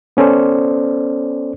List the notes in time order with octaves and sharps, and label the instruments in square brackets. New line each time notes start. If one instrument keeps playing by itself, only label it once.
[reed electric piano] B3 C#4 A4 C5 D5